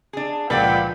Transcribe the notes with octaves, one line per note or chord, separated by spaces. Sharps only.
D4 G#4
C#2 A#2 F3 F4 B4 D5 F#5 G5